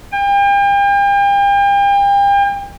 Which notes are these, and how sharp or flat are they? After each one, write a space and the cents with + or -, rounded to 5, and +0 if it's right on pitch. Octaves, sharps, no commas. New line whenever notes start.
G5 +40